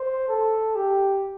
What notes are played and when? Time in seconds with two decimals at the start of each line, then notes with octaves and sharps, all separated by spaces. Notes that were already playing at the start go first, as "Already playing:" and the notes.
Already playing: C5
0.28 A4
0.76 G4